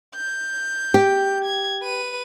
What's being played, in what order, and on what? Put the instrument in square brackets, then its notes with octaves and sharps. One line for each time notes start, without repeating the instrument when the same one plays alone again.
[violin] G6
[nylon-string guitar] G4
[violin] G#6
B4 D#7